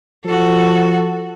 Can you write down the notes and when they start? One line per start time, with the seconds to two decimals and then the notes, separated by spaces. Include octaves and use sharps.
0.25 F3 F#4 A4